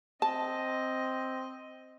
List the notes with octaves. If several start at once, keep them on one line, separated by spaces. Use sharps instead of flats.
C4 D#5 A5